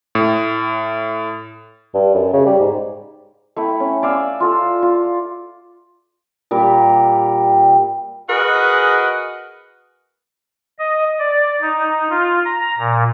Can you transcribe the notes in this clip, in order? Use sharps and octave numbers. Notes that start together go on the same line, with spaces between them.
A2
G2
F#2
C#3
G3
G#2
A3 E4 G5
C#4
D5 F5 G#5 E6
F4 A4 E6
F4
A#2 G3 A#4
F#4 G#4 A#4 B4 D#5
D#5
D5
D#4
F4
A#5
A#2